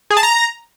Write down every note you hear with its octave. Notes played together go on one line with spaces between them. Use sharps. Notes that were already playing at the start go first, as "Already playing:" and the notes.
G#4
A5
A#5